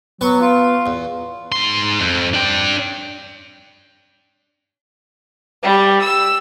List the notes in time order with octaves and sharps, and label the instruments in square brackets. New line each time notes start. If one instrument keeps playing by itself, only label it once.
[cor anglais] F#3 [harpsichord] B3 B4 C#6
[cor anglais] F4
[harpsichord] E2
[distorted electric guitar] G#2 C6
F2
D4 G5
[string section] G3
E6